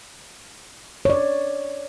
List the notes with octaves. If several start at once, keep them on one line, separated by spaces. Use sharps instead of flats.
C#5 D5